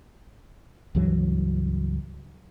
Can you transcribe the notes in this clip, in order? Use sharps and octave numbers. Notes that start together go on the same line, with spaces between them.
C#2 G2 E3 F#3